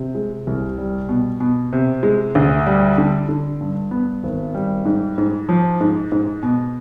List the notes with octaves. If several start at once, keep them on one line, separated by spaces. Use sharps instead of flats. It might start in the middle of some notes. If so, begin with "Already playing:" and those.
Already playing: C3
G#3
C2
G3
B2
B2
C3
G#3
D2
G3
D3
D3
G2
B3
G#1
G3
G#2
G#2
F3
G#2
G#2
B2